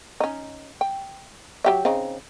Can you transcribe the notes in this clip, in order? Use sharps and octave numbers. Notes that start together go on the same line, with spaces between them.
C#4 D#4
G5
F#3 G4 E5
C#3 C4 D#4